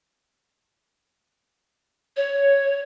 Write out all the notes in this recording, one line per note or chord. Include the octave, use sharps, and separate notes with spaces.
C#5